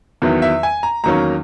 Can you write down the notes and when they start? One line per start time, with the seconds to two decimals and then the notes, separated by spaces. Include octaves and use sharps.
0.22 E2 D#3 F#3 B3 E4
0.42 E5
0.63 G#5
0.83 A#5
1.04 E2 D#3 F#3 A#3 C#4 A#5